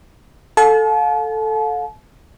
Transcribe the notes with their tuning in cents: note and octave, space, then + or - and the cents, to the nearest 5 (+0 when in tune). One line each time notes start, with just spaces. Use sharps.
A4 +0 F5 +40 A5 -40